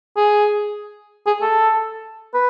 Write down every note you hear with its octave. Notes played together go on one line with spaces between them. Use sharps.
G#4
G#4
A4
B4